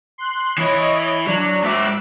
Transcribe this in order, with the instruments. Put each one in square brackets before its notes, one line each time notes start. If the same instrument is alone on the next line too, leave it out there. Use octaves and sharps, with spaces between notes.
[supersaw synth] C6 F#6
[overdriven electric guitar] E3 E4 [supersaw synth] C#5 D#5 D7
[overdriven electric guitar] F#3 [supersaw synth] D4
[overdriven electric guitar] G#2 E5 [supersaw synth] D6 E6 F#6